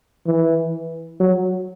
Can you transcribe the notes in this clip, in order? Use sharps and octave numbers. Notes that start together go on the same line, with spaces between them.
E3
F#3